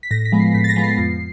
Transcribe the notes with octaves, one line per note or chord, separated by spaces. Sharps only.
B6
A2 A#6
B6
F3 G#3 B3
C7
A2 B6
A6
A#6
F3 G#3 B3
C7
F2